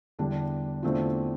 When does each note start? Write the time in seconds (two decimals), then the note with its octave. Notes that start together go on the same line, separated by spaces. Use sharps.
0.19 E2 D3 G3 D4
0.83 E2 D3 A3 C4 F4